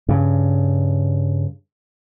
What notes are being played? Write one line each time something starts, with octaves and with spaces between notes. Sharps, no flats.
G2 C#3